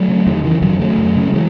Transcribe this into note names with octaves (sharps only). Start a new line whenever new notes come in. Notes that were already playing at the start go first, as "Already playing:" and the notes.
Already playing: F#3 A3
C#3
E2 D#3
C#3 E3
F#2 D#3 F#3
C#3 F#3 A3
F#2
C#3
A3
E3 G#3